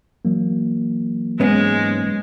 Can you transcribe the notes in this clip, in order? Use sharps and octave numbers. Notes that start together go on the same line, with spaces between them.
E3 F#3 A#3
G#2 G#3 B3 C#4